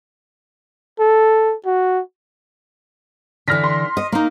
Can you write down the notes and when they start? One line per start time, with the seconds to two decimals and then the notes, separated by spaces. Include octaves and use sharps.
1.00 A4
1.66 F#4
3.48 D3 E3 F6 A#6 B6
3.64 C6
3.97 D#5
4.12 A#3 D#4